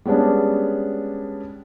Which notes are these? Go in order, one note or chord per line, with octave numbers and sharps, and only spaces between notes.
G3 G#3 B3 C#4 D4